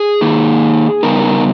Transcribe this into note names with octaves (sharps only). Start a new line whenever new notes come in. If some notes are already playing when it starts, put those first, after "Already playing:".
Already playing: G#4
D#3 A#3 D#4
C#3 G3 B3 D#4 A#4